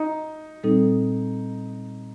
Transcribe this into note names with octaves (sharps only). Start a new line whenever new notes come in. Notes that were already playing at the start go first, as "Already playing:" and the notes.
Already playing: D#4
A#2 G3 C4 D#4 A4